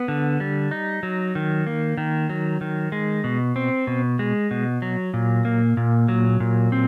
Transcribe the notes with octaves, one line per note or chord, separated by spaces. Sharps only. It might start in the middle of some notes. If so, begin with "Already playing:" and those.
Already playing: B3
D3
G3
D#4
F#3
D#3
A#3
D#3
F#3
D#3
G#3
B2
C4
B2
G#3
B2
F#3
A#2
A#3
A#2
F#3
A#2
C4